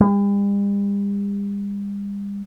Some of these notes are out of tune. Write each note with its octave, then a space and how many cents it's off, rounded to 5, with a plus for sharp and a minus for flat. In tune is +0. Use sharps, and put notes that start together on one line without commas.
G3 +45